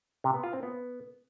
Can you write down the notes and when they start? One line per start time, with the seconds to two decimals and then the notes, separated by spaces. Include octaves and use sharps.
0.24 C3
0.34 B3
0.44 F4
0.53 C4
0.63 B3